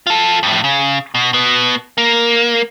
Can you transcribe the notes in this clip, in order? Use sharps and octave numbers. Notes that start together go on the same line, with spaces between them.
F4 A4
F2 A2
C#3
B2
B2 B3
A#3